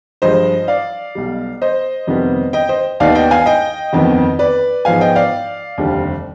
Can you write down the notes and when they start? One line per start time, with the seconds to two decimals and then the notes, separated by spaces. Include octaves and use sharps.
0.22 G2 F3 G#3 C5 D#5
0.68 D5 F5
1.15 B1 B2 G3
1.62 C5 D#5
2.07 F2 C3 D#3 G3 B3
2.53 D#5 G5
2.69 C5 D#5
3.00 D#2 D#3 B3 D#4 D5 F5
3.15 D#5 G5
3.31 F5 G#5
3.46 D#5 G5
3.93 G1 F2 D#3 B3
4.39 B4 D5
4.85 G#2 F3 B3 F5 G#5
5.01 D#5 G5
5.16 D5 F5
5.78 F1 D#2 D3 G3 C4